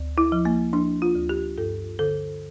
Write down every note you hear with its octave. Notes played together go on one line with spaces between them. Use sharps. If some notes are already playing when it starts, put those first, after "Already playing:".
Already playing: D2
E4
F3
A#3
F3 D4
F4
D2
G4
G2 A4
D3 A4